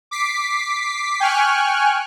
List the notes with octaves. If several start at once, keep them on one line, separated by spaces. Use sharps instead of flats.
D6 B6 C7
G5 G#5 C#6 F6 F#6